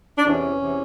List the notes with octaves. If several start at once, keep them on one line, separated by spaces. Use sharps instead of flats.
D4
E2 C3 E3 C#4
E2 C3 E3